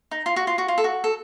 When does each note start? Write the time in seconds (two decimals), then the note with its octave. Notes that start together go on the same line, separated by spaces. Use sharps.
0.11 D#4
0.26 F4
0.36 F#4
0.47 F4
0.58 F#4
0.68 F4
0.78 A4
0.84 F#4
1.04 A4